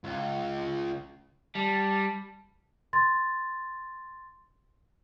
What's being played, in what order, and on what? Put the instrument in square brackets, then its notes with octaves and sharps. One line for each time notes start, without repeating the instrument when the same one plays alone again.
[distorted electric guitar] C#2
[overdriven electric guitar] G3 [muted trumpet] A5
[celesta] C6 A6